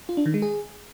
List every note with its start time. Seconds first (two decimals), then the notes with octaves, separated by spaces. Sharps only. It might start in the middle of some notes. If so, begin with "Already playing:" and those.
0.09 F4
0.17 D4
0.26 D#3
0.34 G#3
0.42 G#4